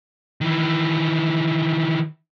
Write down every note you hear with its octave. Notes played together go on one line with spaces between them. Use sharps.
D#3 E3